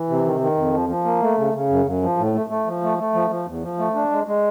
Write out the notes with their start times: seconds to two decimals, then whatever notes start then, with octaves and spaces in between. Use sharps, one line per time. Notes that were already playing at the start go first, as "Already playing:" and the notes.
Already playing: E3
0.09 C3
0.25 D#3
0.41 D#3
0.57 F2
0.73 F3
0.89 F3
1.05 A#3
1.21 A3
1.38 C#3
1.54 C#3
1.69 F#2
1.86 F#2
2.02 F3
2.18 A2
2.34 A3
2.50 A3
2.66 F3
2.83 A3
2.98 A3
3.14 F3
3.30 F3
3.47 E2
3.63 F3
3.79 A3
3.95 D4
4.11 G#3
4.27 G#3